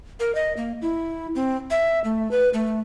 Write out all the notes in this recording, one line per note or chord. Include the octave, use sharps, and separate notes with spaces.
A#4
D#5
A#3
E4
C4
E5
A3
B4
A3